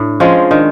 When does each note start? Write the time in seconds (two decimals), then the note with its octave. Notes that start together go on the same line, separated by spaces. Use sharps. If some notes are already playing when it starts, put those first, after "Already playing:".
Already playing: A2 D4
0.20 F3 G#3 C#4
0.51 D#3 D4